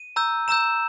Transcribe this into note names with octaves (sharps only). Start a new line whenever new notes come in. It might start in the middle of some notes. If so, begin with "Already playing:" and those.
Already playing: D#7
A#5 E6 G6
A#5 E6 G6 E7